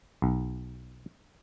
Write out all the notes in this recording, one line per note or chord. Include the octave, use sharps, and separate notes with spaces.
B1